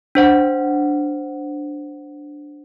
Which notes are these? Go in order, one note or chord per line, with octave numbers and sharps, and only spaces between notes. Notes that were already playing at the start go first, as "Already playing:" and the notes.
D4 C5 F#5